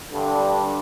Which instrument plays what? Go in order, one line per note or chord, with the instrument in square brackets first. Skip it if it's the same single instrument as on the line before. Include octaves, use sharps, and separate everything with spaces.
[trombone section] G2 D3